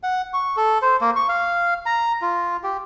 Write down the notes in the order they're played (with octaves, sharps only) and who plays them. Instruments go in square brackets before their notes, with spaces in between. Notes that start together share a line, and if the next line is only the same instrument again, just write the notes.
[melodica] F#5
C#6
A4
C5
A#3
C#6
F5
A#5
F4
G4